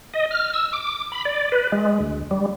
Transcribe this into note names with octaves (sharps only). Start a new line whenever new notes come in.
D#5
F6
E6
D6
B5
D5
B4
G#3
D2
G3